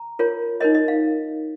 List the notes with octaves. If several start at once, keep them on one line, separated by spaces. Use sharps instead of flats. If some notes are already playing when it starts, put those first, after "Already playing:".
Already playing: A#5
F4 A#4 C#5
D#4 A#4 C#5 D#5
D#5
F5